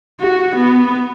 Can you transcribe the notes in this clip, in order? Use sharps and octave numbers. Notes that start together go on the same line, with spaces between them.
F#4
B3